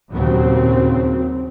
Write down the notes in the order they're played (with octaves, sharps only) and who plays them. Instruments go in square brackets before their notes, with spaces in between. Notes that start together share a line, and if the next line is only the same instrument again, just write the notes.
[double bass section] D#2 A#2 C#3 F#3 C4